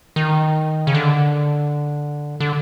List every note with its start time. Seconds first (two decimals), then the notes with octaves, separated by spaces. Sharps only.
0.16 D#3
0.87 C#3
0.95 D3
2.40 D3